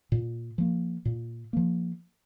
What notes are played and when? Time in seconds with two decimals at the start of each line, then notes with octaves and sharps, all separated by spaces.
0.12 A#2
0.58 F3 A#3
1.05 A#2
1.53 F3 A#3